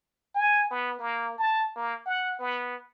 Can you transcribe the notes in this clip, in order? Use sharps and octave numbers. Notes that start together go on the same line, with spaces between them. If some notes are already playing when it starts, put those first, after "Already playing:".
G#5
B3
A#3
A5
A#3
F#5
B3